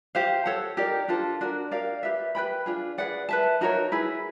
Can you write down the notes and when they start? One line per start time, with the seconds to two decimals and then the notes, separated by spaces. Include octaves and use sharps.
0.15 G4 C5 F5
0.46 A4 C#5 F#5
0.77 D#4 G4 A#4 D5
1.08 D4 F4 A4 C5
1.41 D4 F#4 A#4
1.71 G4 A#4 D5 F5
2.03 G4 B4 E5
2.35 B4 D5 G5 B5
2.66 D4 F4 G#4
2.98 G#4 B4 D5 F#5
3.29 B4 E5 A5
3.61 D#4 F#4 A#4 C#5
3.92 E4 G#4 B4